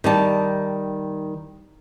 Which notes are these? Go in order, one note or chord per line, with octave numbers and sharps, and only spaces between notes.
D#3 G3 A5